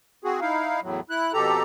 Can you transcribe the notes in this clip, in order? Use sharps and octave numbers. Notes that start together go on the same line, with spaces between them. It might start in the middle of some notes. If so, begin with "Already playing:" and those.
C4 F#4 G#4
D#4 E4 F5
E2 A2 F#3
E4 F#6
F2 B2 G4 A4 A#5